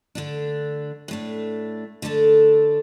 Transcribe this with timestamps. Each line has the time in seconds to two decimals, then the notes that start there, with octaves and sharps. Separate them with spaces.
0.15 D3 A3 D4
1.08 A2 A3 D4
2.02 D3 A3 D4 A4